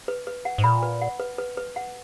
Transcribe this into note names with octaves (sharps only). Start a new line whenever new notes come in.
B4
B4
F#5
G#2
A#2 B5
B4
F#5
B4
B4
B4
F#5